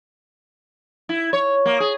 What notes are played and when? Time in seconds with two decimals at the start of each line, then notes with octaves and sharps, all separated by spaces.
1.09 E4
1.33 C#5
1.66 A#3
1.80 G#4